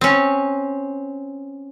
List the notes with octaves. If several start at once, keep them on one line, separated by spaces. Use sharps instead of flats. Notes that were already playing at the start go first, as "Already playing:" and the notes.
C4 C#4